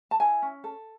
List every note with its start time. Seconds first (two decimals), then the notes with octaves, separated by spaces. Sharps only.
0.11 A5
0.20 E4 G#5
0.42 C#4
0.64 A4